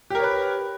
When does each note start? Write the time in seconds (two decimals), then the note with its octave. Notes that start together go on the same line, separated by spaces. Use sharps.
0.10 G4
0.15 A#4
0.19 C#5
0.23 B4